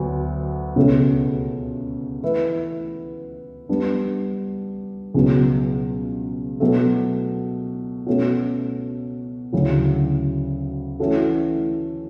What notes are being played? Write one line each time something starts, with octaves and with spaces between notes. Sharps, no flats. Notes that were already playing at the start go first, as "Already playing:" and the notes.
Already playing: D2 F#3 B3
C#2 B2 A3 C#4
E3 A3 E4 B4 E5
G3 B3 D4
C#2 B2 F#3
B2 F#3 A3
B2 A3 C#4 F#4
D2 C#3 F#3 C#4 E4
E3 A3 C#4 F#4 A4